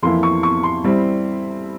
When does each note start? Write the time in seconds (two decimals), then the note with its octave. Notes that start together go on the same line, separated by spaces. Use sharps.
0.03 F2 E3 A#3 E4 C6
0.23 C#6
0.43 C#6
0.63 C6
0.84 G3 C4 E4